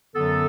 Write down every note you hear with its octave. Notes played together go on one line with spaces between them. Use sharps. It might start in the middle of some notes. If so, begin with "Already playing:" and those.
F#2 D3 F#3 B3 A4